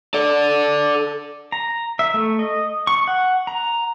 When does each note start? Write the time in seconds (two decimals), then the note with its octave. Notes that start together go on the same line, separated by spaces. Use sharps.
0.14 A4 D5
1.52 A#5
1.99 E5
2.14 A3
2.39 D#5
2.87 C#6
3.07 F#5
3.47 A#5